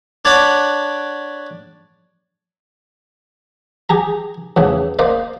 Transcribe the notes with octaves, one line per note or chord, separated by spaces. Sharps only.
D4 C#5 F#5 G5 B5 D6
G4 G#4 A#5
E2 A2 C#3
A#3 C5 D5 D#5